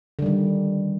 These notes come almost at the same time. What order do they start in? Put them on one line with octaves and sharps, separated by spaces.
D3 G3 D#3